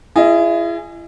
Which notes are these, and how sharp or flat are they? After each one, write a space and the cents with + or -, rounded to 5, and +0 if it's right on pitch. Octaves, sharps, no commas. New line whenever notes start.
E4 +40 G#4 +0 D#5 +0